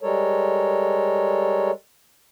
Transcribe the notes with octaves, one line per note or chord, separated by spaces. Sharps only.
G3 G#3 A4 A#4 C#5